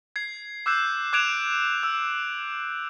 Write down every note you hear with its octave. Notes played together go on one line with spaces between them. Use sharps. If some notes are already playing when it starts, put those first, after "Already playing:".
G#6 C7
D6 E6 F#6 G6 C7 E7
D6 F#6 G#6 D7 E7 F7
E6